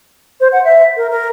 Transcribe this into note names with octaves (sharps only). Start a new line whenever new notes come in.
C5
F#5
E5
A#4
A#4